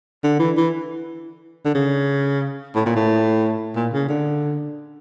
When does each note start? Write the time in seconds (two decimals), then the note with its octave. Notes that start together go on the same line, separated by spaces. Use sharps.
0.24 D3
0.39 E3
0.57 E3
1.65 D3
1.75 C#3
2.75 A2
2.86 A#2
2.96 A2
3.76 A#2
3.93 C#3
4.09 D3